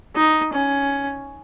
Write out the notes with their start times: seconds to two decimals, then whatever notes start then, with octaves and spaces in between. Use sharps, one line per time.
0.15 D#4
0.53 C#4